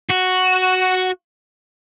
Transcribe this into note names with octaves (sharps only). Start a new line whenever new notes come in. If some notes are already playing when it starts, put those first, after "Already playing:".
F#4